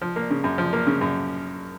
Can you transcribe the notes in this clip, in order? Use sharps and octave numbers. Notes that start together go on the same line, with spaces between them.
F3
A#3
C#3
F#2
F3
A#3
C#3
F#2